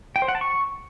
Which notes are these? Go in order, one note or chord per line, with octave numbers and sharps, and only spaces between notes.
G5
C5
F#5
A5
C#6